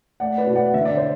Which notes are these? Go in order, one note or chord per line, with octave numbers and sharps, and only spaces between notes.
A3 D5 F#5
B4 D5
B2
D5 F#5
D3 E5
D5
C5